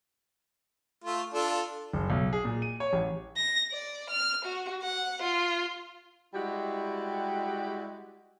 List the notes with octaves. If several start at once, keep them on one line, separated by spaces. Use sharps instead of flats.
A3 F4
D4 F4 A4
F#1
B1
G#4
A#2
D#7
C#5
A1
A#6
D5
F6
F#4
F#5
F4
G3 G#3 E4 F#4 G4